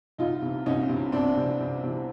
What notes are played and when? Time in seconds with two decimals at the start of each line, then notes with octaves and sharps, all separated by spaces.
0.18 C2 D#4 F4
0.42 C3 E3
0.66 C2 C#4 D#4
0.89 C3 E3
1.12 C2 C4 D4
1.37 C3 E3
1.60 C2
1.83 C3 E3